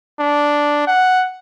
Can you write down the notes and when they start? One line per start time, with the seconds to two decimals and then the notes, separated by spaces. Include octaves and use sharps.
0.19 D4
0.87 F#5